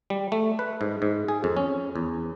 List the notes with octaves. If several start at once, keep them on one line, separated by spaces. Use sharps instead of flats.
G3
A3
B4
G#2
G#2
G#4
F2
C#4
E2